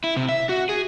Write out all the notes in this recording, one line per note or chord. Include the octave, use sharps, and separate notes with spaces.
E4
C3
E5
F#4
G#4